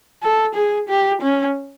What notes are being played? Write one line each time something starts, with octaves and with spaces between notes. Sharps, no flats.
A4
G#4
G4
C#4